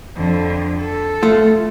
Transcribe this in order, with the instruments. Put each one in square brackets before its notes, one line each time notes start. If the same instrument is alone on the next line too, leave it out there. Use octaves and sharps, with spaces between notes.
[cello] F2 D3
A4
[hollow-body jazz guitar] A3 F4